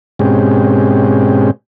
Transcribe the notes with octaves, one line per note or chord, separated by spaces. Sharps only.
G#2 B2 G#3 C4 C#4 G4